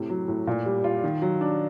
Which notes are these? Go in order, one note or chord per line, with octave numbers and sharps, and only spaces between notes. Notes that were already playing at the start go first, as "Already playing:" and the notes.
Already playing: A2 C3
F#3
A2
A#2
G3
F4
D#3
F#3
D4